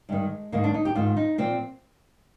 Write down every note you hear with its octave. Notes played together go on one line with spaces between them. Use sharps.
G2 D#3 G#3
G#2 D#3 A#3
D4
D#4
G4
G#2 D#3 F4
D#4
A#2 F3 C4